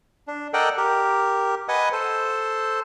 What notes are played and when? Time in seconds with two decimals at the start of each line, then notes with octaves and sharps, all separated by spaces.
0.27 D4
0.53 A4 A#4 D5 D#5 F#5 G5
0.78 G4 A#4
1.68 B4 D#5 F#5 G#5 D#6
1.92 A4 C5